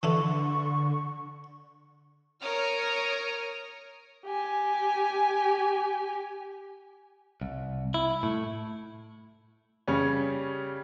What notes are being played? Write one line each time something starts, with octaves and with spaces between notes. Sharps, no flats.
D3 E3 A4 D5 C#6
A#4 C#5 D#6 F6
G4 G#5
C2
E4
A2
C#3 G3 C#4